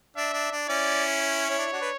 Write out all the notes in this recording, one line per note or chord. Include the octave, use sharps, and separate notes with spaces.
D4 E5
D4
D4
C#4 E4 D5
C#5
C#4
D4
E4
D4 F#4
B4